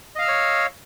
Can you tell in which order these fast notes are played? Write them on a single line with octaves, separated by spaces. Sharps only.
D#5 F5 F6 E6 C#5